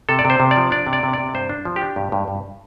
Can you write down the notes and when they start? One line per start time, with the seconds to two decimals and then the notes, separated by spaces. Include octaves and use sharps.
0.09 C3 A4
0.19 D5
0.25 C3
0.30 C5
0.40 C3
0.51 D5
0.56 F3
0.71 D4 D5
0.86 C3
0.93 D5
1.03 C3
1.13 C3 D5
1.34 G2 C5
1.49 D4
1.65 F3
1.76 G4
1.81 D4
1.96 G2
2.12 G2
2.28 G2